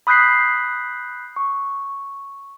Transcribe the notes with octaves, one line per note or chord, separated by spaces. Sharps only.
B5 D#6 F#6 G6 B6 C7
C#6